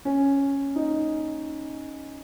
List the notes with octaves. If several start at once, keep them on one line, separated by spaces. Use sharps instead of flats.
C#4
D#4